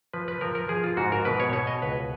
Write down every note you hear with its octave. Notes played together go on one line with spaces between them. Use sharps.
F3 B4
B4
F3 A#4
A#4
F3 G#4
F4
G#2 F#4
A#4
B2 B4
C#5
B2 C#5
D#5
C#2 B4